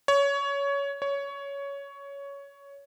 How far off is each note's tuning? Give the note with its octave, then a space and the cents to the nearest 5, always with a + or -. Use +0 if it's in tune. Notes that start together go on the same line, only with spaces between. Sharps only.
C#5 +20
C#5 +15